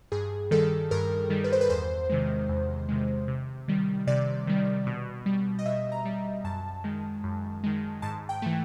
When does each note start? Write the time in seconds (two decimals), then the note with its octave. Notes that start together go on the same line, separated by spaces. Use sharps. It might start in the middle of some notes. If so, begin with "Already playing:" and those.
0.12 G2 G#4
0.51 D#3 G3 A4
0.91 G2 A#4
1.30 D#3 G3
1.44 B4
1.52 C5
1.61 B4
1.70 E2 C5
2.09 C3 D#3 G#3
2.49 E2
2.89 C3 D#3 G#3
3.28 C3
3.68 D#3 G3
4.07 C3 D5
4.47 D#3 G3
4.87 B2
5.26 G3
5.59 D#5
5.65 B2 E5
5.92 A#5
6.05 G3
6.44 F#2 A5
6.84 D#3 G#3
7.24 F#2
7.64 D#3 G#3
8.02 G#2 A5
8.29 G5
8.42 E3 A3